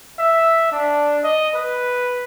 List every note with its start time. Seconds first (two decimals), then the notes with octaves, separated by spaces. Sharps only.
0.20 E5
0.72 D4
1.24 D#5
1.55 B4